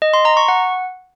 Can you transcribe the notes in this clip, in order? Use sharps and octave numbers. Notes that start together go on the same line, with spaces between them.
D#5
C6
A#5
C#6
F#5